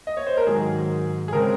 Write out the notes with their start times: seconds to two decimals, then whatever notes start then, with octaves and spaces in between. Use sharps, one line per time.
0.07 D#5
0.17 C#5
0.27 C5
0.37 A#4
0.47 G#2 D#3 F#3 G#4
1.28 G#4
1.33 C#3 G#3 C4 A#4